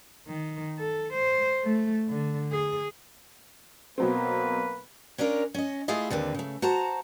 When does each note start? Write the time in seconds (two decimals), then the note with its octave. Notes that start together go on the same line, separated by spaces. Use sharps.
0.28 D#3
0.79 A4
1.14 C5
1.64 A3
2.09 D3
2.52 G#4
3.98 B2 F#3 A#3 C4 B4
5.18 C#4 D4 F4 A#4 C#5
5.54 C#4 D#5
5.88 A3 E4 F4 G#4 D#5
6.10 D#2 D3 C4 B4
6.34 C#3 A3
6.62 F#4 C5 A5 A#5